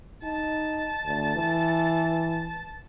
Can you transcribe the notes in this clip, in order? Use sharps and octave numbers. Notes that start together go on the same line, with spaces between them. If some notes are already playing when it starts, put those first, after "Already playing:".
D#4 A5
D2
E3